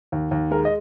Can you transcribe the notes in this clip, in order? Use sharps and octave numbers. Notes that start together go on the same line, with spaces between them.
D#2
D#2
G#3 A#4
D#5